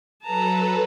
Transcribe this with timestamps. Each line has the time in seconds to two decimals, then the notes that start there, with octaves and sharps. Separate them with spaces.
0.24 F#3 A4 B4 A5 A#5